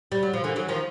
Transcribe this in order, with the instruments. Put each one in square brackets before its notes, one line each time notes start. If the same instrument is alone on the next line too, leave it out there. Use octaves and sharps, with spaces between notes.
[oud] G3
F#3
F3
D3 E3
E3 F#3
D#3 F3